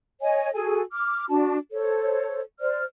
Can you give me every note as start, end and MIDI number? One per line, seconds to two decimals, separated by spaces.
0.21 0.50 73
0.21 0.50 75
0.21 0.50 80
0.55 0.81 66
0.55 0.81 68
0.55 0.81 69
0.55 0.81 80
0.92 1.25 86
0.92 1.25 89
1.28 1.56 62
1.28 1.56 66
1.28 1.56 81
1.72 2.40 69
1.72 2.40 72
1.72 2.40 73
2.61 2.83 72
2.61 2.83 74
2.61 2.83 89